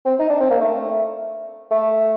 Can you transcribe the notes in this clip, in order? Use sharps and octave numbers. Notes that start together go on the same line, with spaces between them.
C4
D#4
D4
C4
A#3
A3
A3